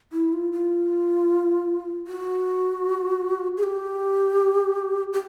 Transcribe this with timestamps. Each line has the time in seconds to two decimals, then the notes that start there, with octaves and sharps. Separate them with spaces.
0.12 E4
0.33 F4
0.52 F4
2.07 F#4
3.57 G#4
3.63 G4
5.13 G4